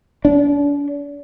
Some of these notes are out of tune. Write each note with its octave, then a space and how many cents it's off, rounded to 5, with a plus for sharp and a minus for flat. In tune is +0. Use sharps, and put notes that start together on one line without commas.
D4 -40